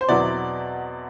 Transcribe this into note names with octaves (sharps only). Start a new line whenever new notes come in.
C5
E2 B2 F#3 C4 E4 D5